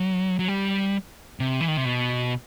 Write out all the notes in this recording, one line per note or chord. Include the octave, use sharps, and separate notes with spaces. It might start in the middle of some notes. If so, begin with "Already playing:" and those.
Already playing: F#3
F#3
G3
C3
E3
D#3
C3
B2